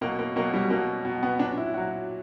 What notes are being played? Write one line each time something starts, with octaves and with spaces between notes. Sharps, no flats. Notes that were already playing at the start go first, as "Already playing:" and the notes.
B2 F#3 A#3
A#3
B2 F#3 A#3
G3
B2 F#3 A#3
B2 F#3
B3
A#2 F#3 D4
E4
A#2 F#3 F#4